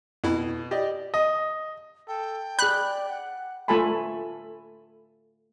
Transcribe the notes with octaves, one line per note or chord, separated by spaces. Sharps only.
F2 B2 E4
G4 D5 D#5
D#5
A4 G5
G#4 D5 B5 F#6
F#5
A3 F4 A4 G#5 A5 B5